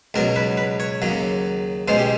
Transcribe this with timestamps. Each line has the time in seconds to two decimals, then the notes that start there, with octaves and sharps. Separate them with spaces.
0.14 C#2 B2 F#3 A#4
0.36 B4
0.57 B4
0.80 C#5
1.02 D#2 C#3 F#3
1.88 C#2 B2 G#3 C#4 C5
1.99 G4